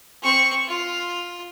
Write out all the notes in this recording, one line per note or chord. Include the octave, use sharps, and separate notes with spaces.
C4 C#6
F4